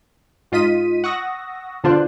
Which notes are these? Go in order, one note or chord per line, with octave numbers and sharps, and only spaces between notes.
G#2 F4 D#5 B6 D#7
F#5 C#6 D#6 E6 A#6
B2 D3 D4 F4 C5 F#6